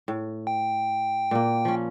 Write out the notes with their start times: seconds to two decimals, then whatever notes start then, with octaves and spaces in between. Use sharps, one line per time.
0.08 A2
0.47 G5
1.31 A#2 A#3
1.65 F3 C#4